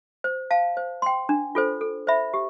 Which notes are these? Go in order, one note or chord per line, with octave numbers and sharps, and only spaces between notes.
C5
F5 A5
C5
G5 C6
D4
F4 A4 C5
A4
C5 E5 B5
G4